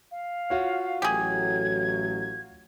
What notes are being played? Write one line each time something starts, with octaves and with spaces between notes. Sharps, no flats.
F5
F4 F#4 C#5
A1 A2 F#3 G4 G#4 G#6